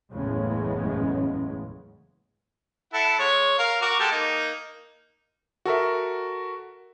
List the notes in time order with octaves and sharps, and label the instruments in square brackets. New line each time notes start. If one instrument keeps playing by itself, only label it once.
[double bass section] F#1 E2 A2 C#3 G#3 B3
[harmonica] E4 A4 F#5
G#3 C#5
A#4 F5
F#4 A#4 D6
G#3 G4 A4
A#3 D#4
[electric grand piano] F#4 A4 A#4 E5